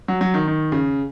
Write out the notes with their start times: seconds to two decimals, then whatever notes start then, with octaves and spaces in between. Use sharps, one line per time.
0.08 F#3
0.21 F#3
0.34 D#3
0.47 D#3
0.72 C#3